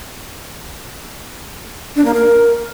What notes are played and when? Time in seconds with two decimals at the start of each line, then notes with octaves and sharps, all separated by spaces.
1.96 D4
2.05 A#3
2.14 A#4